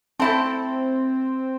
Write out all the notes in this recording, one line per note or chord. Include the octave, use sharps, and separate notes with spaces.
A3 C4 E4 A4